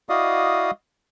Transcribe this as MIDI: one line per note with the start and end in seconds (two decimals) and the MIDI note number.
0.09 0.71 64
0.09 0.71 66
0.09 0.71 74
0.09 0.71 75
0.09 0.71 77
0.09 0.71 87